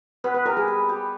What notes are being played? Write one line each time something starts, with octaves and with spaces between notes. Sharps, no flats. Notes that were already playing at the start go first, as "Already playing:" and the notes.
B3 B4
B4
G3 A#4
G#4
B4
G4